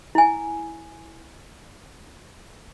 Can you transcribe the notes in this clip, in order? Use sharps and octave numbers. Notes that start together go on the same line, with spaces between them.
E4 G#5